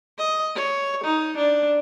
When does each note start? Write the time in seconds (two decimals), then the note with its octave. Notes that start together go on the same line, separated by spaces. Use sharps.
0.18 D#5
0.55 C#5
1.04 D#4
1.37 D4